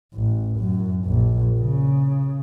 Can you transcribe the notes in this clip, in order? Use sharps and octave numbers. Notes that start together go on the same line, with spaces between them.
A1
F#2
A#1
C#3